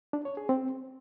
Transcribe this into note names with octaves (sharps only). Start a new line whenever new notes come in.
D4
C#5
G#4
C4